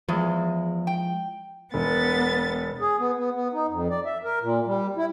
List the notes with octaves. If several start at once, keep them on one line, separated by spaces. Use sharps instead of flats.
E2 F3 G#3
G5
E1 B3 A6
G#4
B3
B3
B3
D#4
F2
D5
E5
A#4
A#2
G3
E4